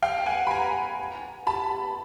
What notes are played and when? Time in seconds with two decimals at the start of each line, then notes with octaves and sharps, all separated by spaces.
0.02 F5 G5
0.26 F#5 G#5
0.47 B5
0.51 G#5 A#5
1.47 A5 B5